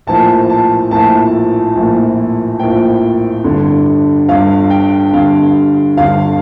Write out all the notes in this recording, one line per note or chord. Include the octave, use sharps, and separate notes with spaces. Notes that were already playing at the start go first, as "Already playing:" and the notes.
A#1 A2 F3 A#3 A5
A5
A#1 A2 F3 A#3 A5
A#1 A2 F3 A#3
A#1 A2 F3 A#3 G5
G1 G2 D3
G1 G2 D3 F5
G5
G1 G2 D3 F5
G1 G2 D3 F5